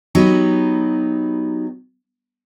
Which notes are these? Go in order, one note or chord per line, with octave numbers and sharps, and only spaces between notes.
F#3 B3 D#4 G4